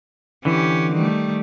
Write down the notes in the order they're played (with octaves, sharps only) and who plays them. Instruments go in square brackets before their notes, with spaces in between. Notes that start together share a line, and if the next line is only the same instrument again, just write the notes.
[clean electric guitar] D3 E3 [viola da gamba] C#4 G4
[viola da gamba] D#3 G3 A3